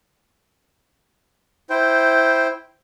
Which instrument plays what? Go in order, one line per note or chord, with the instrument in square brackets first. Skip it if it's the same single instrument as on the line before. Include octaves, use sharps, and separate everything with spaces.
[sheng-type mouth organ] E4 C5 G5